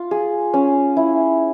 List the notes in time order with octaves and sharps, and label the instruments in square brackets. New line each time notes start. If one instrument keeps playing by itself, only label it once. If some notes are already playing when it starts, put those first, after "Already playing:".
Already playing: [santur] F4
G#4
C#4
E4